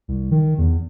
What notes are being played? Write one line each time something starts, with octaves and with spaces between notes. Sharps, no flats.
C2
D#3
E2